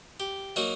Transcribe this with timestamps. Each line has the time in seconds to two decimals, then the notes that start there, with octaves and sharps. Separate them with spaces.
0.20 G4
0.56 F#3 A#3 D#4 F#4